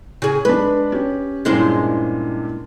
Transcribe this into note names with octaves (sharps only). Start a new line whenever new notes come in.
C#3 G#4
G#3 D4 B4
C#4 G4
G2 A#2 G#3 C#4 E4 C5